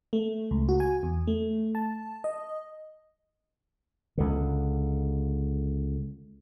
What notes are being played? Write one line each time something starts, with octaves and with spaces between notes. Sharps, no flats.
A3
C#2
F#4
G#5
E2
A3
A5
D#5
C#2 D3